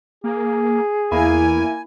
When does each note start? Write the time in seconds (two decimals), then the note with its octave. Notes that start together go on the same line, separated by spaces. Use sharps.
0.24 A#3 G#4
1.12 E2 A#3 E4 G#5